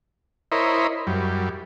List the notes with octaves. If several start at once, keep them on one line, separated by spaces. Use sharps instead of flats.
E4 A#4 C5 C#5 D#5 B5
F#2 G3